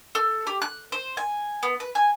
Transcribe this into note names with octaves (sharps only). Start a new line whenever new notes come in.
A4
G4
F#6
C5
G#5
B3
B4
G#5